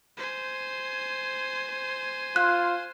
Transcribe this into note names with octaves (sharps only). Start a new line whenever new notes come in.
C5 G#5
F4 F#6